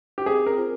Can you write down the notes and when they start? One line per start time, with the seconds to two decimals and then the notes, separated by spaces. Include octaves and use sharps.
0.18 G4
0.26 C4 G#4
0.46 A#4
0.57 F4 C5